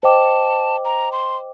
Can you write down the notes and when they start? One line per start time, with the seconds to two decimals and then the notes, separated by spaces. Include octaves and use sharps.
0.03 C5 D#5 G5 A5 D6
0.85 A#5
1.12 C6